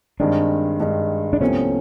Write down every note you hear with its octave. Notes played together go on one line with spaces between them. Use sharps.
G2 D#3 G#3 C4 D4
G2 D#3 G#3
D4
C2 C3 F3 A3 B3 C#4